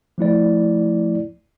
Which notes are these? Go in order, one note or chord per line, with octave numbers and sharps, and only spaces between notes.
F3 A3 E4 D5